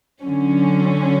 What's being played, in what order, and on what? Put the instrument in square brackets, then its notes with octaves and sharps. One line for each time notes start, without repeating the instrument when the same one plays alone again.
[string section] D3 F#3 C#4